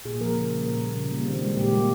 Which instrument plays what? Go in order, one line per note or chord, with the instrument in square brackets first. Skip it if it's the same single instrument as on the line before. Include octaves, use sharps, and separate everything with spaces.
[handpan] A#2 G#4
F3 A#3 A#4
C#3 A#4
G3 A#3
A#2 A#4
G3 A#3
C#3
G3 A#3
D#3 C4
G#3
A#2 G4
G3 A#3